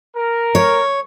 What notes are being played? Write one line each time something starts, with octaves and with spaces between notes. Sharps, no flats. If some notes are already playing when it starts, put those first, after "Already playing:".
A#4
C#5